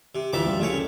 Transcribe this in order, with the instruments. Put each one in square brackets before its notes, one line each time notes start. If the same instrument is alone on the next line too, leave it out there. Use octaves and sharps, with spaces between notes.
[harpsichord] C3
[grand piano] D2 E3 B6 [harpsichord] F3 E5 D6
[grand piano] F#2 G3 F5
[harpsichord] C2 C#3 C#5 [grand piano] A3
[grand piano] C#4 A4